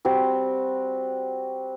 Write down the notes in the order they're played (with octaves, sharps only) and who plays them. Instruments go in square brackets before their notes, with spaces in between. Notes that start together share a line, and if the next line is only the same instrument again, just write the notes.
[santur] G3 C4 F#4